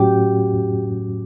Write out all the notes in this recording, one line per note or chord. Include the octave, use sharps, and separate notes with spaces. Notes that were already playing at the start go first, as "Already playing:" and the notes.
Already playing: A2 F#3 C#4 F#4 G4